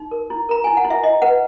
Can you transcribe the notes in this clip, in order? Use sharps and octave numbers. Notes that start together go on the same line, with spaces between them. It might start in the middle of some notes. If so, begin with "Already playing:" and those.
Already playing: D#4
A#4
E4
A#4 A#5
E4 G#5
F#5
E4
E5
E4 D#5
B4 F#5